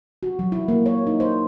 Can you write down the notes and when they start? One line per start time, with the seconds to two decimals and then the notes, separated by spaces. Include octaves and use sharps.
0.23 F#4
0.39 F#3
0.52 E4
0.68 A#3
0.86 C#5
1.07 D#4
1.20 C5